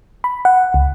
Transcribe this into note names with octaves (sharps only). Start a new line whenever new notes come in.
B5
F#5
C#2